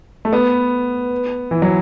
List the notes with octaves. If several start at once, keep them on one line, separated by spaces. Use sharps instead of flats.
A3
B3
E3
F#3